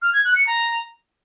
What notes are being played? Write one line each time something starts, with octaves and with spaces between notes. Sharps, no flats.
F6
G#6
F#6
C#7
A#5